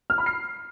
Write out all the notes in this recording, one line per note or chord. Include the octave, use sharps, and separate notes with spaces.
F6
B5
C7